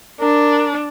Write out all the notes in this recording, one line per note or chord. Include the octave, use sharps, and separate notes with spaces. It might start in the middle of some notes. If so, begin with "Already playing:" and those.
D4 A#4